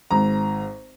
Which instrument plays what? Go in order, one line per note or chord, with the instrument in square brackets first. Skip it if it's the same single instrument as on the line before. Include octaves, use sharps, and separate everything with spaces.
[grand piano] G#1 A#5